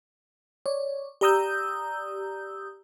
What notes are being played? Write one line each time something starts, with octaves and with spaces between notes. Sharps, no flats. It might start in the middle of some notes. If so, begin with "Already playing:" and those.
C#5 D5
G4 D5 A#5 D#6 E6 G6